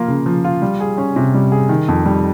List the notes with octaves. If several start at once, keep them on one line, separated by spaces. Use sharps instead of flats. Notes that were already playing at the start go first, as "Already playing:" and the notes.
Already playing: F3 A#3 F4
C#3
F3
F4
G3
G#4
C#4
C3
G3
G#4
D#3
F2
G3